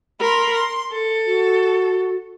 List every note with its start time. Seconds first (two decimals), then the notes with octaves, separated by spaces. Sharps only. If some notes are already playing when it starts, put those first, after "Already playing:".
0.19 A#4 B5 C6
0.52 C6
0.93 A4
1.26 F#4